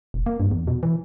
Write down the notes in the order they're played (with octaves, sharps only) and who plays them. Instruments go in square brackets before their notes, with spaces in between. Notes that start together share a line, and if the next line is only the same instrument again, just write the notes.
[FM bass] E1
A#3
G2
E2
B2
E3